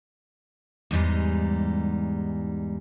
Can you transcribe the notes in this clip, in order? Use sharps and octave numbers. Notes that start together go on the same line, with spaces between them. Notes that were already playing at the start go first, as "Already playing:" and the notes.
E2 G#2 G3 G#3 D#4